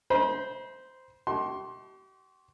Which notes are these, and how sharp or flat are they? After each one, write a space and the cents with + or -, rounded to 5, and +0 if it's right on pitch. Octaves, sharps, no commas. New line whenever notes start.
C5 -10 B5 -45
G4 -45 C6 +25